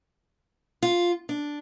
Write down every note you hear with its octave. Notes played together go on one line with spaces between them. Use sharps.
F4
D4